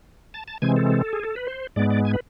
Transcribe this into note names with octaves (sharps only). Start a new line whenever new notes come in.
A5
A5
C3 E3 G#3 C4 G#5
A4
G#4
A4
B4
C5
G#2 G#3 B3 D5
D5
G#5
B4